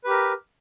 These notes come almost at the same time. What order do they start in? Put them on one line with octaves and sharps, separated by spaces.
B4 G4 A#4